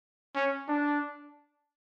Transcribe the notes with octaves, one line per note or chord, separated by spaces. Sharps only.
C#4
D4